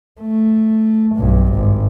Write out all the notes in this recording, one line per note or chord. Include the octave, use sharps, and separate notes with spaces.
A3
B1 G2
G#1